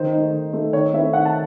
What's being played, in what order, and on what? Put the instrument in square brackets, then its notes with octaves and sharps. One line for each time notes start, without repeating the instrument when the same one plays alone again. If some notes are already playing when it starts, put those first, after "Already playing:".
Already playing: [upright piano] D#3 C5
A3 D#4
D#3
A3 D#4
D#3 C#5
A3 C4 E4 E5
D#3 F#5
A5